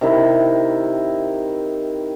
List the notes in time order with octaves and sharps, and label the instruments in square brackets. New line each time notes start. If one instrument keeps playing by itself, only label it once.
[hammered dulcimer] C3 D#3 E4